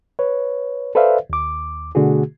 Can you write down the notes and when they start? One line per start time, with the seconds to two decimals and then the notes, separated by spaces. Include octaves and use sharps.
0.19 B4 C#5
0.95 A4 B4 C5 D5 E5 F5
1.30 D#2 D6
1.95 B2 D3 A3 F#4 G#4